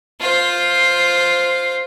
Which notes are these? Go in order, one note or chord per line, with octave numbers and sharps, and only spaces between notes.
F4 C5